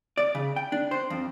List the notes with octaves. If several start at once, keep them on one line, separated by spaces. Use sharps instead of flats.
D5
C#3
G5
D4
C5
F2